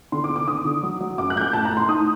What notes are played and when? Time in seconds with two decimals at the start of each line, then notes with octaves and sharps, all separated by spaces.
0.12 D3 C6
0.24 D6
0.29 D3
0.36 D6
0.48 D3 D#6
0.65 D3
0.83 F#3
1.01 F#3
1.18 F#2 D6
1.30 F#6
1.36 F#2 G6
1.41 F#6
1.53 A2 A5
1.65 A#5
1.71 A2
1.77 C6
1.89 D#4 D#6